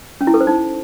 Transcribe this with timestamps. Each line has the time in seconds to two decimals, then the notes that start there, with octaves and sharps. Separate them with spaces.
0.21 C#4
0.27 E4
0.34 A4
0.40 C5
0.47 D#4